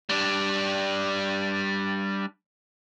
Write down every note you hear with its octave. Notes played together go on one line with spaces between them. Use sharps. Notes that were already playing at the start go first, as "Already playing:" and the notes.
G3 D4